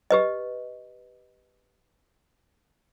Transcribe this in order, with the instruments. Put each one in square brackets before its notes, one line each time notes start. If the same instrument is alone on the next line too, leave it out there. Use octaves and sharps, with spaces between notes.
[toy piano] G4 B4 D#5